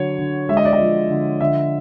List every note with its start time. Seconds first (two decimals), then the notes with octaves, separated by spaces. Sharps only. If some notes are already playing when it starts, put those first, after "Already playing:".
Already playing: D3 F#3 C#5
0.19 D3
0.49 G#3 E5
0.57 D#5
0.65 D5
0.73 D#5
0.80 F3
1.10 D3
1.40 D3 E5